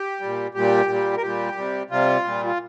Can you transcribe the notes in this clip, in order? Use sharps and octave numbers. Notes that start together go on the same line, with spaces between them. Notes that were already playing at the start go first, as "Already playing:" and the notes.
Already playing: G4
A#2 G3
A#2 G3 G4
A#2 G3
A#4
A#2 G3 G4
C3 G3
C3 G3 F4
A#2 G3
F4